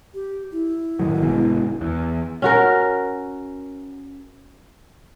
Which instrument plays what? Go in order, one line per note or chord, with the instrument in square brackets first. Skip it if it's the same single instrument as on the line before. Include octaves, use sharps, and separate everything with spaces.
[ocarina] G4
E4
[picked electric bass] A2 D#3 F#3
G1 B2 G#3
E2
[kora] C#4 F#4 A#4